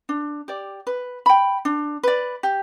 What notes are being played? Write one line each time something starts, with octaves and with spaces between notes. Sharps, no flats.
D4
G4 D5
B4
G5 B5
D4
B4 D5
G4